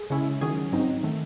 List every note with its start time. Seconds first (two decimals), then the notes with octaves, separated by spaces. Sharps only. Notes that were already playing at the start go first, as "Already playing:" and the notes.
Already playing: G#4
0.10 C#3 G#3 C#4 E4
0.41 D#3 F#3 C#4 G#4
0.72 G#2 F#3 C4 D#4
1.03 D#3 A3